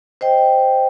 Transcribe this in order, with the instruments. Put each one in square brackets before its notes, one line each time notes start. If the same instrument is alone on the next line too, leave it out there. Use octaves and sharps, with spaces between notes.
[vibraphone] C5 D#5 G5